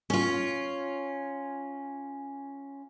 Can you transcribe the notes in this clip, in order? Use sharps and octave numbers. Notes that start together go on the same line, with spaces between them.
C#4 F4